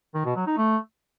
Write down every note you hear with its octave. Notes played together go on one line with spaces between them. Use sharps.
D#3
B2
F#3
D#4
A3